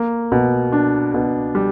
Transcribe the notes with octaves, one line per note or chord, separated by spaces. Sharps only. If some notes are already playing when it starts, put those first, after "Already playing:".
Already playing: A#3
B2
D4
B2
G3